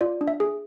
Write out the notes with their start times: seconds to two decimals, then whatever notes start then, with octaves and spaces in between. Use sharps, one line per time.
0.01 F4 D5
0.21 D4
0.28 E5
0.40 G#4